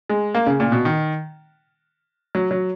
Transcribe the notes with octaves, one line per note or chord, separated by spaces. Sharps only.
G#3
A#3
C#3
A#2
B2
D#3
F#3
F#3